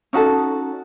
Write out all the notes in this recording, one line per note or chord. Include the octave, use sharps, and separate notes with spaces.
C#4 D#4 F#4 A4